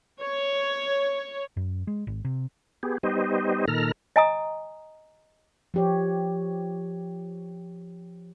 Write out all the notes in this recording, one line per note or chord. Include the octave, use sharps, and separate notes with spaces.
C#5
F#2
G#3
G#1
C3
B3 G4 G#4
G3 B3 D#4 G4 C5 D#5
A#2 D#3 A4 A#5 F6
D#5 G#5 A#5 D#6
F3 G4 C#5